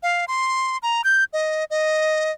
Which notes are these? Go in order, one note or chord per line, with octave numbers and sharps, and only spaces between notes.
F5
C6
A#5
G6
D#5
D#5